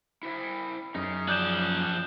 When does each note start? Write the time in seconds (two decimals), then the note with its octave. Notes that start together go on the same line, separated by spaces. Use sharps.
0.23 E4 C5 E5
0.95 F#2 C#4 D#4 G#4
1.28 F3 D5 F#6 G6 E7